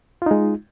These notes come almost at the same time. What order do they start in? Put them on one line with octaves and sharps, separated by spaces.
F4 D#4 G#3